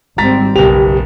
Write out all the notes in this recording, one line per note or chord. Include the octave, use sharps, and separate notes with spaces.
G#1 G3 C4 A#5 A6 B6
F#1 B1 B3 G4 F7